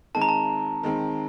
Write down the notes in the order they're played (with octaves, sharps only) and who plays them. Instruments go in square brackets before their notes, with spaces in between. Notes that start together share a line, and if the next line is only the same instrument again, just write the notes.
[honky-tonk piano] D#3 G#3 C4 [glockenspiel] A5
[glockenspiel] A#5
A5
[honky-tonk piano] D#3 G#3 C4